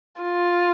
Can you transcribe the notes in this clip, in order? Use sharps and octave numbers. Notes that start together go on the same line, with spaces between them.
F4